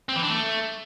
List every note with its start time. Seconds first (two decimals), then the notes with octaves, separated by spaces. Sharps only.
0.09 C4
0.16 E3
0.23 D4
0.30 A3